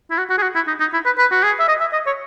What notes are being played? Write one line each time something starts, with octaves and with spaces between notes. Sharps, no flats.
E4
F#4
F#4
G#4
F#4
E4
D#4
D#4
E4
B4
B4
F#4
G#4
E5
D#5
E5
D#5
C#5